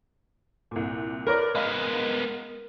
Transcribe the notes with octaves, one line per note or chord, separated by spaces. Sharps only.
C2 A#2
A#4 B4 C#5 D5
G#3 B3 D#5 F5 B5